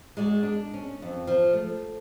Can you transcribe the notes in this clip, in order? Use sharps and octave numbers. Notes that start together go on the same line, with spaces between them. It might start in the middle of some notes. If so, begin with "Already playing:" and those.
G#3 F#4 D5
D4
C#4
F2
F3
A3